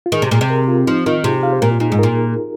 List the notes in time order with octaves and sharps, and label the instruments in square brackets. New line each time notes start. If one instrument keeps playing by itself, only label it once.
[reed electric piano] F4
[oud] D#3 [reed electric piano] G#4
[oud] C3
A#2
C3
[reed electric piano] A#4
F4
[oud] F3 [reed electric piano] D#4
[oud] D#3 [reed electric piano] F4
[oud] C3 [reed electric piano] G#4
[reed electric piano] F5
C5
[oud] A#2 [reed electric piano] A#4
[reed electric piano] F4
[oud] A#2 [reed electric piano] D#4
[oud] G#2 [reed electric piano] G#4
[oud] A#2 [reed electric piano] A#4